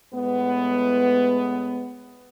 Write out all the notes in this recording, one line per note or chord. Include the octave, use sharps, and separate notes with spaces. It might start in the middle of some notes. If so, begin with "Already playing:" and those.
A2 G#3 B3